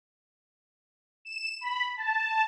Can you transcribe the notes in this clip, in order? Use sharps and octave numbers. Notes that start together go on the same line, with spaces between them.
E7
B5
A5